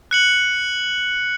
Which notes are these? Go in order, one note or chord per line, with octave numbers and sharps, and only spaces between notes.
F#6 C#7 F#7